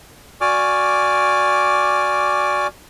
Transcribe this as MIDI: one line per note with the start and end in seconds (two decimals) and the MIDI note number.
0.41 2.67 66
0.41 2.67 74
0.41 2.67 80
0.41 2.67 86
0.41 2.67 89